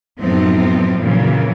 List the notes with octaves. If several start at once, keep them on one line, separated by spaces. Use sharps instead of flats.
F#2 A2 F3 B3 C4 D#4
F2 A#2 C#3 E3 F#3